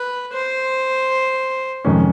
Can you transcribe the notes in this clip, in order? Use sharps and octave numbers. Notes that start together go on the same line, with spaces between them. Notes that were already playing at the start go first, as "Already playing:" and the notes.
Already playing: B4
C5
F2 C3 D#3 G#3 C#4